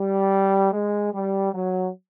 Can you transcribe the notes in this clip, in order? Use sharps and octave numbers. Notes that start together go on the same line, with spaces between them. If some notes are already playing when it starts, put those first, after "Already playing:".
Already playing: G3
G#3
G3
F#3